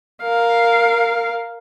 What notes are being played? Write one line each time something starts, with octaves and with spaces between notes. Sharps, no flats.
A#4 F5